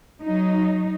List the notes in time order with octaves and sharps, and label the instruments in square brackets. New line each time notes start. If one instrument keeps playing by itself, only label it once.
[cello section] F#3 D#4